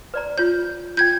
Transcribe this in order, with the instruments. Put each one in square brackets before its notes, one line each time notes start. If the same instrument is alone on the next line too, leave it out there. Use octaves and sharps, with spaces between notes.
[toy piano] B4 D5 A#5
[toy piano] F4 C#5 [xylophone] G6
[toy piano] F4 G5 [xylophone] G6 G#6